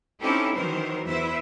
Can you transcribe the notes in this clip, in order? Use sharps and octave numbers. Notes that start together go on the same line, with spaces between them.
C4 C#4 D#4 E4 G4 A4
D#3 E3 F#3 A#4 C5
E2 E4 B4 C5 E5